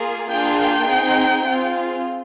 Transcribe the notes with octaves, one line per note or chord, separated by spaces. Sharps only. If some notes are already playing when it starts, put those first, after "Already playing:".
Already playing: A#3 F4 G#4
A#3 D4 F4 G#4 G5
G5
C4 D#4 G#4
C4 F4 G#4